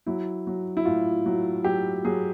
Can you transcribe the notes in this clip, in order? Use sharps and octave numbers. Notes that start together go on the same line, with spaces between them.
F#3 E4
F#3
E4
A2 F4
F#3
F#3 G4
F#3 G#4